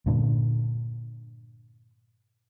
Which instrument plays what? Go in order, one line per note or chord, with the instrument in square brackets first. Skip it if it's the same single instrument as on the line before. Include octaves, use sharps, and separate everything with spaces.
[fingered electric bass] G2 A#2 D3